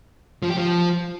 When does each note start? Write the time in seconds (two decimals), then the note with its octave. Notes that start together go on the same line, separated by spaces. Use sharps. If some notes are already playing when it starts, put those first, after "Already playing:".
0.43 F3
0.50 G4
0.57 F3